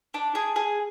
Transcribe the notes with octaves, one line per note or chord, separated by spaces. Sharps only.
D4
G#4
G#4